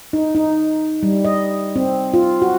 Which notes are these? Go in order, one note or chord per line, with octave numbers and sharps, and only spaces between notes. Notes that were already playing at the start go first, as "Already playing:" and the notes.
D#4
D#4
G3
D#5
C4
F4
F#4